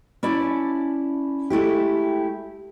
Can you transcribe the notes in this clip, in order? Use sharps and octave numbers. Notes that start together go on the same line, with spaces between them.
C#4 E4 D5 A5
G#3 A3 E4 G4